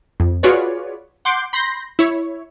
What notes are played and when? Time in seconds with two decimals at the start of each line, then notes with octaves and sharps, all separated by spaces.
0.20 F2
0.43 F4 F#4 G#4 B4 C#5 D5
1.25 F#5 C6 D6 G6
1.53 B5 C6 G6 A#6
1.99 E4 C#5